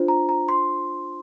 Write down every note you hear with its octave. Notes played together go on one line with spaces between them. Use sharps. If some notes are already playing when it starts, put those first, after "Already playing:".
Already playing: D4 F4 C5
A#5
A#5
C6